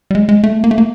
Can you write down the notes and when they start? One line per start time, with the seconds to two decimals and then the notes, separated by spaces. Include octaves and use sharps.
0.11 G3
0.15 G#3
0.29 G#3
0.44 A3
0.64 A#3
0.71 A3
0.78 A#3